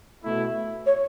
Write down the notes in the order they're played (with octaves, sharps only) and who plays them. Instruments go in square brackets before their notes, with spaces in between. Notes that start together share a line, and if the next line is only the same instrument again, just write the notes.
[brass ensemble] B2 A3 E4
[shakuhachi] C#5